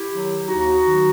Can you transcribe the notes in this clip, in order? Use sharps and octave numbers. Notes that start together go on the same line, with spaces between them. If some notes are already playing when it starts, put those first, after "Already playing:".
Already playing: E4 G4
D#3 F#3
D#2 D#4 F#4
D#3 F#3